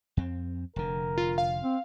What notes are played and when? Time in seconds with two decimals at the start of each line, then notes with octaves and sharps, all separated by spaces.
0.17 F2 C4
0.76 F1 D3 A#4
1.18 F4
1.38 F5
1.62 C4